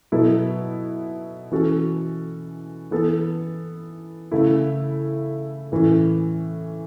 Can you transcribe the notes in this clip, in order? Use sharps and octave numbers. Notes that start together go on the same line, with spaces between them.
B2 F#3 B3 E4 A4
E3 C#4 F#4 A4
E3 B3 A4
C#3 A3 E4
A2 E3 C#4